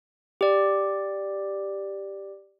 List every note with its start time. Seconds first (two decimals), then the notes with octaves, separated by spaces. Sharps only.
0.41 G4 D5